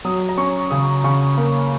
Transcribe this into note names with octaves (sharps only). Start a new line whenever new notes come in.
F#3 D#6
A#5
C#4 C#6
C#3 D#6
C#3 C#6
A#3